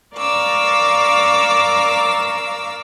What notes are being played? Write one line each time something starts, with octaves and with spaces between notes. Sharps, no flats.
A#4 D5 F5 C#6 D6 E6